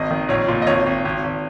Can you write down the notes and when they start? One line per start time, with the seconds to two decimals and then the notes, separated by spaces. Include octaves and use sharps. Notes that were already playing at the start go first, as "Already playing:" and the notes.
Already playing: G#1 D#3 D#5
0.11 D#3
0.29 A#1 C#5
0.48 A#2
0.62 D#5
0.67 G#1 C#5
0.86 G#1
1.05 G#1
1.24 G#1